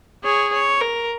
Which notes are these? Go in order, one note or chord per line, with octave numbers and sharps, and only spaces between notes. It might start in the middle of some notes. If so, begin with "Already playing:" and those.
G#4 C#5
C#5
A#4